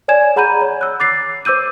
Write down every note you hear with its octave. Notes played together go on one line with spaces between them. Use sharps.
C#5 D5 G#5 G#6 E7
G#4 F#5 A#5 B5 G6 D#7
C#5
E6 F#6
D6 A6 C7
C5 D6 E6 G6 D#7